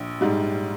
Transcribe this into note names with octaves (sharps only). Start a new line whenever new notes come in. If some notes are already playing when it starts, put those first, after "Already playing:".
Already playing: A#1
G#2 G3